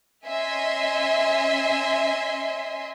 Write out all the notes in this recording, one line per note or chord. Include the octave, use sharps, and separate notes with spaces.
C#4 D#5 E5 G#5 C6